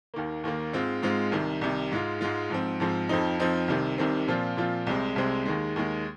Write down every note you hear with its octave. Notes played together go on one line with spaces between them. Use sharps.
D#2 D#3 A#3
D#2 D#3 A#3
G#2 G#3 C4 F4
G#2 G#3 C4 F4
C2 C3 D#3
C2 C3 D#3
G#2 G#3 F4
G#2 G#3 F4
G#2 F3 C4
G#2 F3 C4
F2 F3 C4 D#4
F2 F3 C4 D#4
C2 C3 D#3 C4
C2 C3 D#3 C4
A#2 F3 C4 F4
A#2 F3 C4 F4
C2 C3 G#3 C4
C2 C3 G#3 C4
D#2 D#3 G#3
D#2 D#3 G#3